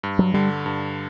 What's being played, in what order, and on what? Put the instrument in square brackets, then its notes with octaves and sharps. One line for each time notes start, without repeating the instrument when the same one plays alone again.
[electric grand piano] G2
[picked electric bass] F#3
[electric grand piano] D3 [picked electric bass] G3
[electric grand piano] G2